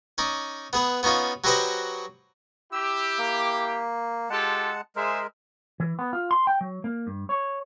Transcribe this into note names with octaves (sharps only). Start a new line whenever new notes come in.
C#4 D#4 D5
B3 G#4 B4
B3 C#4 D#4 F4 C#5
F#3 F#4 G4 B4 C5 D#5
E4 G4 E6
A#3
G#3 F4 G4 A4 F#5 A5
G#3 G#4 A#4 C5 E5
E3
B3
F4
C6
G5
F#3
A#3
G2
C#5